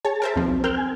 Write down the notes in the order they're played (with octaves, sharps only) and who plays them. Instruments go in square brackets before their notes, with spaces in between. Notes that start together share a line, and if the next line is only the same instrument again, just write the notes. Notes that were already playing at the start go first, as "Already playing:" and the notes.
[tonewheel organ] G#4 A5 [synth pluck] C#5
[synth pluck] A#4 C5 E5
[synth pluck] D#2 B2 F3 [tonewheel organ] C4
[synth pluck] B1
[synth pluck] C4 [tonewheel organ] A#4 F6 G6
[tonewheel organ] G#5